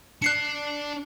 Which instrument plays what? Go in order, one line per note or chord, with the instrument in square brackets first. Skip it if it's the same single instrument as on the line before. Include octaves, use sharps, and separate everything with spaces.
[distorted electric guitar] D4 D5 [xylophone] F#6 C7 C#7